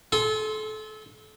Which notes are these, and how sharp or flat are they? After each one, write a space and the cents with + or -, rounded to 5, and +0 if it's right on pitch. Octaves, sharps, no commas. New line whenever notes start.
A4 -30 G#5 +5 C6 +0